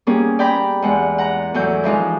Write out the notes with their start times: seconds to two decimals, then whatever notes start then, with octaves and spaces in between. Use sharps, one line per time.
0.07 G3 A#3 B3 C#4 G#4
0.39 D5 G5 A#5 B5 D6
0.82 E2 G#3 F#5
1.18 F#5 A#5
1.54 E2 A2 F#3 G6
1.84 E3 F3 G#3 D#4